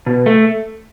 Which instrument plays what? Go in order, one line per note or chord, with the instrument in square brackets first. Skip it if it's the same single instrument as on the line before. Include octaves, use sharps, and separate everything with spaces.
[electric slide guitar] B2
A3